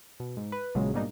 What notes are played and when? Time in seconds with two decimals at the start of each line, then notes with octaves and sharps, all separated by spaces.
0.20 B2
0.37 G#2
0.52 B4
0.75 A#1 C#3 F#3 G#3
0.94 G#2 B2 G3 A#3 D4 D#4